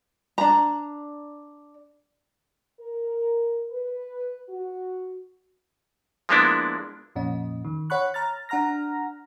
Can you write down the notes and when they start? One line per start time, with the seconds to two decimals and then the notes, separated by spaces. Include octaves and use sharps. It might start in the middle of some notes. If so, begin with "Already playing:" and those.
0.38 D4 A#5
2.81 A#4
3.71 B4
4.49 F#4
6.29 F3 G#3 A#3 B3 D4 E4
7.16 F2 A#2 C#4 D#5
7.65 D#3
7.90 C#5 F#5 B5 C#6 F#6
8.14 A#5 F6 A6
8.49 D4 F#5 A#5 F6 A#6